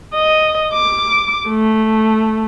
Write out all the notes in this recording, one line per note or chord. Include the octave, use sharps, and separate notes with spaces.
D#5
D6
A3